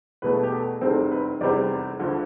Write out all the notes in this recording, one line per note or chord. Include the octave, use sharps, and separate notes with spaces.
E2 B2 A3 B4
G4
A4
F1 E2 C3 G3 C4 A4
B4
F1 E2 C3 G3 C4 D5
D2 D3 F3